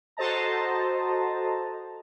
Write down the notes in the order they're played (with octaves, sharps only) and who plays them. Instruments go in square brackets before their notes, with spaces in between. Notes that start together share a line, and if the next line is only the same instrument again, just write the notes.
[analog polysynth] F#4 A4 C5 D#5 A5 A#5